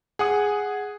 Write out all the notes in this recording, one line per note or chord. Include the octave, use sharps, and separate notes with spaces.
G#4 F#5 D#6